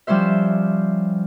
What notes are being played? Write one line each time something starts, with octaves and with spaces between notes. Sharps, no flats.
F3 G3 C#4 C5 E5